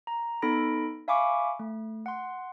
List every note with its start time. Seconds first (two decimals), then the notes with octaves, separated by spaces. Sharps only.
0.07 A#5
0.42 B3 D#4 A4 B5 A#6 D7
1.08 E5 F5 G#5 B5 C#6 D6
1.60 A3
2.06 F#5 C6